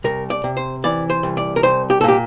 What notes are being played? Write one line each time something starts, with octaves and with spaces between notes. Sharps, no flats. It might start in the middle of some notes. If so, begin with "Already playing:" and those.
C2 A#4
D5
C3
C5
E3 D5
C5
C2
D5
A#4
C2 C5
G4
A4
A#2 G4